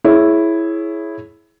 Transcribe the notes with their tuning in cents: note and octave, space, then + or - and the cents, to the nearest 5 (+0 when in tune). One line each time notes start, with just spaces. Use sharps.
E4 +0 G#4 +20 C#5 -10